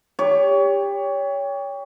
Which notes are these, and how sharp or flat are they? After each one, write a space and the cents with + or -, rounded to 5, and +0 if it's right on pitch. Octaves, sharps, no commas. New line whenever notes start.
G4 +25 C#5 +25